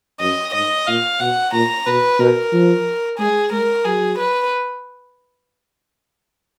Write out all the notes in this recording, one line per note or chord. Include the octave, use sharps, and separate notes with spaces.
F#2 D#5
G#2 D#5
A#2 F5
B2 F#5
A#2 A#5
B2 B4
B2 A#4
F3
G#3 G#4
G#3 A#4
F#3 G#4
B4